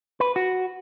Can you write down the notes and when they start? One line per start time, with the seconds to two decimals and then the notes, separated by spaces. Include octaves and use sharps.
0.20 B4
0.36 F#4